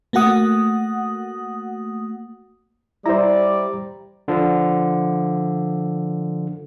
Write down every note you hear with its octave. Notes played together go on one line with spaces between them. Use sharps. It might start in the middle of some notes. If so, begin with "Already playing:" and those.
A3 A#3 F#4 F#5 D#6
G3 E4 C5 D5 A#5
D3 F3